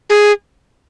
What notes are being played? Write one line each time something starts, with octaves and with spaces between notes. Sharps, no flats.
G#4